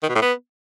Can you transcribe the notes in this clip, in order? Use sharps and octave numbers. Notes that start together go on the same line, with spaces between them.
D#3
B2
A2
B3